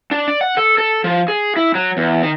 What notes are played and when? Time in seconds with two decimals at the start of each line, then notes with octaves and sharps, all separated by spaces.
0.11 D4
0.28 D5
0.41 F#5
0.57 A4
0.78 A4
1.04 F3
1.28 G#4
1.56 E4
1.75 F#3
1.97 E2
2.23 D#3